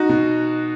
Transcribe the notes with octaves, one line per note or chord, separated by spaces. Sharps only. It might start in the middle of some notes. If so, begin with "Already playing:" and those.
Already playing: D#4 F#4
B2